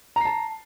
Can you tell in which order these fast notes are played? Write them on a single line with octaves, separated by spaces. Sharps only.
A#5 C7 A5